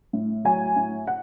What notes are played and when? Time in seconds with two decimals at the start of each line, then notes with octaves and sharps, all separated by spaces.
0.13 A2
0.45 F#3 G#5
0.76 A2
1.07 F#5